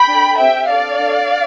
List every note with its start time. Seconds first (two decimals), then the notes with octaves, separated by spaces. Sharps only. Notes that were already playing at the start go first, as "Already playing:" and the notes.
Already playing: G5 B5
0.08 D4 A4
0.38 C4 G4 E5 G5
0.68 D4 A4 D5 F5
0.99 D4 A4